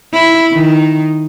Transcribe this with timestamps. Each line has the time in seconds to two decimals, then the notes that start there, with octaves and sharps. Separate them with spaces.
0.13 E4
0.52 D#3